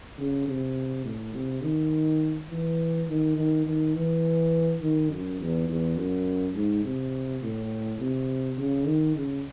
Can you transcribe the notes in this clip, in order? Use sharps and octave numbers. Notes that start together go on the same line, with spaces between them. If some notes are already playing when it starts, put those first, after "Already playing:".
C#3
C3
A2
C3
D#3
E3
D#3
D#3
D#3
E3
D#3
F#2
E2
E2
F#2
G#2
C3
A2
C3
C#3
D#3
C#3